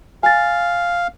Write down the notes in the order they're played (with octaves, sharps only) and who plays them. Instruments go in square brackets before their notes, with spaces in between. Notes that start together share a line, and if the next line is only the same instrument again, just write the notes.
[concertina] F5 [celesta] G#5 A6